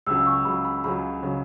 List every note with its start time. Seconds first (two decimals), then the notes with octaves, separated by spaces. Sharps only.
0.07 C#2 C#3 F#3 E6
0.26 C#6
0.45 C#2 C#3 F#3 B5
0.65 B5
0.84 C#2 C#3 F#3 B5
1.23 C#3 F#3